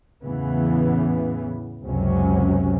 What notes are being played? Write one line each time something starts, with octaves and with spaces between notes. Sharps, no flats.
E2 A2 C#3 E3 B3
C#2 F#2 C3 F#3 C#4